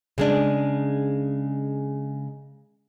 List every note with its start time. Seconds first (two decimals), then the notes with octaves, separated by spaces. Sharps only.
0.18 C#3 G#3 D4